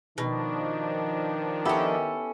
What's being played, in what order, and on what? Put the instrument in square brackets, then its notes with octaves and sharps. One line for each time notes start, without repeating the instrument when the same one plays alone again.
[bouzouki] B2 [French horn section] D#3 [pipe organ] F3 D4
[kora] B3 E4 G4 [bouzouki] C#4 A4